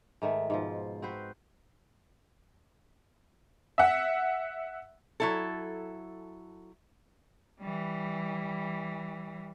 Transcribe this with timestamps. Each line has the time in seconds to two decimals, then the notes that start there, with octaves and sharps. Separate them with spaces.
0.22 G#2 D#3 A3
0.50 G#2 B2 F3
1.02 C4 F#4 B4 C5
3.78 E5 F#5
5.20 F#3 E4 A4
7.60 E3 G3